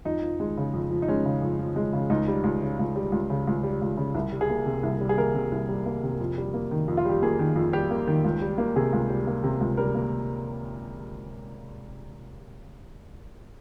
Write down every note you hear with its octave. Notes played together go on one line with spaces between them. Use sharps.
F2 D#4
F3
G#3
C#3
F2
F3
D#4
G#3 C#4
C#3
F2
F3
G#3
C#3
C#2 D#4
G3
C#2
C#3
C#2
G3
C#2
C#3
C#2
G3
C#2
C#3
C2
G3
G#4
A#3
C3
C2
G3
G#4
A#3 A#4
C3
C2
G3
A#3
C3
F2
G3
A#3
D#3
F2
F4
G3 G4
A#3 G#4
D#3
F2
G3 G4
A#3
D#3
C#2
G3
A#3
C3 G#4
C#2
G3
A#3
C3
C#2
G3 A#4
A#3